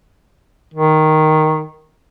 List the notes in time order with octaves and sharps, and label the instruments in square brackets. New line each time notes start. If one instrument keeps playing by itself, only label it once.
[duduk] D#3